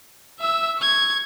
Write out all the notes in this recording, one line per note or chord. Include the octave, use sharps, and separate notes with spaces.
E5 E6
C#6 G#6